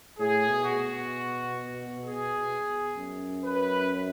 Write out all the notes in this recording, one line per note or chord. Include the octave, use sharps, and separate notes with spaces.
A2 G#4
B2
F#4
B2
G#4
F#2
B4